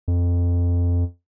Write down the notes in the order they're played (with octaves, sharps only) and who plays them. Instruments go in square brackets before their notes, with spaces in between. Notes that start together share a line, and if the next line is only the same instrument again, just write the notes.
[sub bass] F2